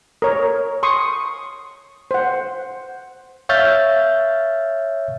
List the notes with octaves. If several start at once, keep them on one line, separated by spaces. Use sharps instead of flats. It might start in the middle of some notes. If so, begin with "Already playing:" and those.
A#4 C#5
C6 C#6 D#6
C5 F#5
C#5 E5 F5 F6 G6 A6